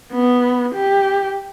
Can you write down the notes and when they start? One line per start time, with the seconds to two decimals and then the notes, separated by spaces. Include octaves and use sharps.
0.12 B3
0.75 G4